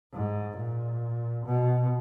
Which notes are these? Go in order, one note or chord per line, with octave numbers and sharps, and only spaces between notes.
G#2
A#2
B2